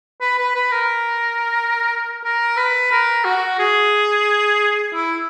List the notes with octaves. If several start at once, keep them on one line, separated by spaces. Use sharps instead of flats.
B4
B4
B4
A#4
A#4
B4
A#4
F#4
G#4
E4